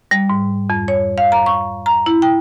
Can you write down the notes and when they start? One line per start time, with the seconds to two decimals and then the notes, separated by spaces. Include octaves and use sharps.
0.11 G3
0.30 G#2
0.70 F2
0.88 C#5
1.18 F5
1.32 A#5
1.46 C#6
1.86 A#5
2.06 E4
2.22 G5